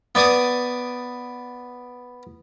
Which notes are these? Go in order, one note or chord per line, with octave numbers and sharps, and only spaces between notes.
B3 D5 G#5 D6 D#6